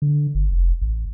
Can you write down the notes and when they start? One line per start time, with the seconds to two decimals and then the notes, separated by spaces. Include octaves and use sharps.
0.02 D3
0.35 G1
0.51 F1
0.82 A1